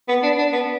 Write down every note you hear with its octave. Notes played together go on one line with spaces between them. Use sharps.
B3
D4
D4
B3